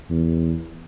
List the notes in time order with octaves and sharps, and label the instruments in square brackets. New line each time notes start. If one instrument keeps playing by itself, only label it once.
[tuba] E2